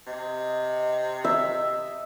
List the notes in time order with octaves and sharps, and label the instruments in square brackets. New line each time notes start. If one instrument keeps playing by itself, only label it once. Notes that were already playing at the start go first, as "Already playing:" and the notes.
[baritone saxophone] C3 [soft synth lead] D#5
[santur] E5